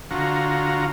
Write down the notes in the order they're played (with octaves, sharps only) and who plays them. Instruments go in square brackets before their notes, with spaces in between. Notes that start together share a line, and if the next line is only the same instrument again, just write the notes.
[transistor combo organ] D3 F4 F#4 A#5